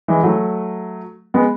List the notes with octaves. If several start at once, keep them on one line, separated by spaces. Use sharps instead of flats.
E3 G#3
F#3 A3
G#3 B3